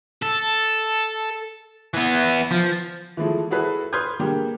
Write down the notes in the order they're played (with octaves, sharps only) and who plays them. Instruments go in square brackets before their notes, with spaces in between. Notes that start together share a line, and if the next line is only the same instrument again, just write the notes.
[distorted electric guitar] A4
E3 B3
F3
[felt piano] E3 F3 G#3 A3
E4 F#4 G#4 A4 B4
B4 C6 D#6 F6 G6 G#6
G3 G#3 A#3 D4 G4